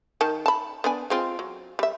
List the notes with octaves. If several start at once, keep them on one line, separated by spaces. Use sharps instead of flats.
D#3 A5
A5 B5
B3 D4 G#5
G#3 C4 F4
F#3
G3 E5